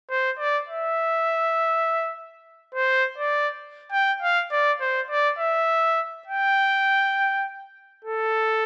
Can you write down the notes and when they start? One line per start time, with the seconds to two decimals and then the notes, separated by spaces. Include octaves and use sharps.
0.10 C5
0.39 D5
0.68 E5
2.75 C5
3.18 D5
3.92 G5
4.22 F5
4.52 D5
4.81 C5
5.10 D5
5.39 E5
6.27 G5
8.04 A4